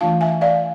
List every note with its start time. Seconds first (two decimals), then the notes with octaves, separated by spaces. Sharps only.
0.01 E3 A3 D4 F4 F5 A5
0.21 E5 G#5
0.41 D5 F5